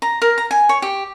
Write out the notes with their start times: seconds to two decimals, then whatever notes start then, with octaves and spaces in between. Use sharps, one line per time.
0.02 A#5
0.22 A#4
0.38 A#5
0.51 G#5
0.69 C#5
0.82 G4